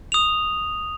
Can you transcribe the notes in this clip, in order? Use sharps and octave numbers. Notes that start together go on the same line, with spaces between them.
D#6 F7